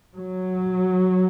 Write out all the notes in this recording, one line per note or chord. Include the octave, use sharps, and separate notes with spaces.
F#3